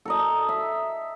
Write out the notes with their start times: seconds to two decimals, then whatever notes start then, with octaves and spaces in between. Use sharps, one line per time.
0.05 A4 A#4 D#5
0.49 E5